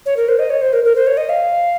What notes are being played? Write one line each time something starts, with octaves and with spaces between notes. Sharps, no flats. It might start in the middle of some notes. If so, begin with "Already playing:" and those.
C#5
A#4
C5
D#5
C#5
C5
A#4
A#4
C5
C#5
D#5
F5